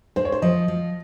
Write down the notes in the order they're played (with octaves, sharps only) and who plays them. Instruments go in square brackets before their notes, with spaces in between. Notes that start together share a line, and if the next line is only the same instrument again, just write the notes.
[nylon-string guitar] G#3 [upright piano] C5
[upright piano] C#5
C5
[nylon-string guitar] F3 [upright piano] D#5
[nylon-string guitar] F3